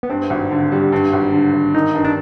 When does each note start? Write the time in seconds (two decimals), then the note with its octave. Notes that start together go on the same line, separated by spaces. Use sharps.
0.03 B3
0.10 G2 C4
0.30 G#1
0.51 D3
0.72 G3
0.92 G2
1.13 G#1
1.33 D3
1.53 G#1
1.75 D#3 D#4
1.95 G2
2.04 D4